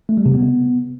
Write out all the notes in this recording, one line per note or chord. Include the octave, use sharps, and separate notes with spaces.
A3
G3
C3
B3